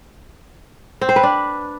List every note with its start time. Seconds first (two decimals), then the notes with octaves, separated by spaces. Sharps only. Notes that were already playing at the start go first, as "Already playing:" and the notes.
1.01 C4
1.09 C5
1.16 B4
1.23 D4